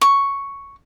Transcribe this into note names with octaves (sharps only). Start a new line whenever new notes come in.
C#6